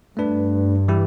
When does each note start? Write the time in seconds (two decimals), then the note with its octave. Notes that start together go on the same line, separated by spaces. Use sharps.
0.17 G2 A3 D4 B4
0.88 E3 G3 E4 G4